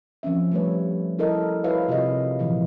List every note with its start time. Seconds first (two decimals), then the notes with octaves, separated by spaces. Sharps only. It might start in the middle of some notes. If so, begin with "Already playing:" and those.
0.23 F3 C4 C#4 E5
0.52 G3 A3 B4 C#5
1.19 E4 A4 A#4 D#5
1.64 E4 F#4 B4 C#5 E5 F5
1.88 C3 F4 G#4 D#5
2.39 A#2 E3 F3 G#3